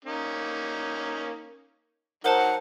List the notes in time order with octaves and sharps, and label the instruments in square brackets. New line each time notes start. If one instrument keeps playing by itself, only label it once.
[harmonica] A#3 C#4 D#4
[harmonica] F#3 D#4 [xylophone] A#4 C5 A5 [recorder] F#5